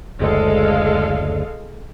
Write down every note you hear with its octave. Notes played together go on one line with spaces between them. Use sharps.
F#1 D2 G#3 A4 F5